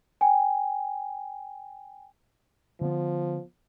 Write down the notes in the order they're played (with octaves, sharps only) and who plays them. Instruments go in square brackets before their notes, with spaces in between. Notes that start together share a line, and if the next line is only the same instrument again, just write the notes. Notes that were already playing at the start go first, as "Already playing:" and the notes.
[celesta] G5 G#5
[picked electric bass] D3 B3 [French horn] F3